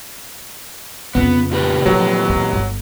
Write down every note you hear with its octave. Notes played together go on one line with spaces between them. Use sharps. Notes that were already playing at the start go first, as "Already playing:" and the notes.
F2 C#3 B3
A#2 G4 B4
D3 F3 F#3
A2
G1